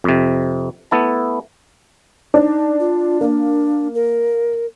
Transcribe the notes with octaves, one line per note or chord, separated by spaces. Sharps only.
F2 C3
A3 B3 E4 A5
D4 D#4
F4
A#3 D4
A#4